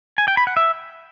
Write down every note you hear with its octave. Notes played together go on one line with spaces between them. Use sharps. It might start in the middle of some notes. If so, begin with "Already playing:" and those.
G#5
G5
B5
F#5
E5